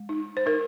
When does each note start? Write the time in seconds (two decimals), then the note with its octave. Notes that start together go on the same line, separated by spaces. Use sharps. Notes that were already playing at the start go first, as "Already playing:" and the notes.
Already playing: G#3
0.09 D#4
0.37 C5
0.46 D#4 A#4